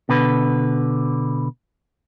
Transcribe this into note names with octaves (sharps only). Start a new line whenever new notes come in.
B2 D3 B4